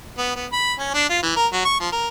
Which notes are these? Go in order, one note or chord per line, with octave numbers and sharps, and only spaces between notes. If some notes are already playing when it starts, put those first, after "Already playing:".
B3
B3
B5
C#4
D4
F4
E3
A#4
F#3
C#6
F3
A#4